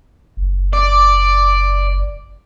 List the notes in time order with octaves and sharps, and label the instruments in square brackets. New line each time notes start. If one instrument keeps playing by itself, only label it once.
[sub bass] F#1
[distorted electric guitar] D5